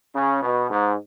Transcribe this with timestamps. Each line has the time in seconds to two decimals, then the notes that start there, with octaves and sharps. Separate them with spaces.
0.15 C#3
0.42 B2
0.71 G#2